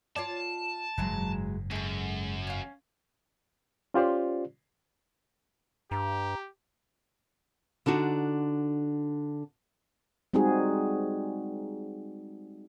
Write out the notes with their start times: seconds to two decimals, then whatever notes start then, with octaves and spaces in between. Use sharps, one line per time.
0.16 F4 C#5 D5 A5
0.97 F#1 G#2 E3 F#3 G#3
1.71 F#2 G#3 A4
2.47 C#4 F5
3.94 C#4 F4 G4 C5 D5
5.91 G2 G4 A#5
7.86 D3 D4 D#4 F#4
10.34 G3 G#3 C4 D#4 F#4 G#4